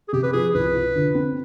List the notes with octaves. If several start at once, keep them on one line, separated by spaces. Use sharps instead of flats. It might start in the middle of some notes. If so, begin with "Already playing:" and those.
G#4
C3 G4
B4
F3 G#4
C2 B4
F4
D3
C4